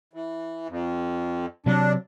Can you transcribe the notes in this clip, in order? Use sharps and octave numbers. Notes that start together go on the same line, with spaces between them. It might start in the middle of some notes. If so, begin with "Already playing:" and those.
E3
F2
C3 F#3 D4